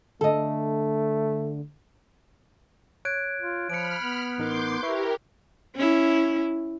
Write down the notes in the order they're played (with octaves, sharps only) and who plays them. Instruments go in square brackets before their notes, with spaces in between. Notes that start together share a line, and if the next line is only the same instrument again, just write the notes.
[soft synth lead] D3 [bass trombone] A3 [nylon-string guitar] A4 D#5
[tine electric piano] C#5 [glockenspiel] F#6 G#6 D7
[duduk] F4
[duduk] F3 [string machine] B5 F6 [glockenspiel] C#7 D7
[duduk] B3
[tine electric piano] A1 D#4 A#4 [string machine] C6 D6 G6
[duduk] E4 [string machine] G4 A#4 [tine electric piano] B4 E5 C#6
[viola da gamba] C#4 E4